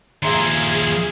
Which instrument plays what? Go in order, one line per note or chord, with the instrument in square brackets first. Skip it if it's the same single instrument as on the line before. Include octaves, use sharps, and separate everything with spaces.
[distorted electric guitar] D#2 F3 [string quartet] G#4 [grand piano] E5 A#5 C6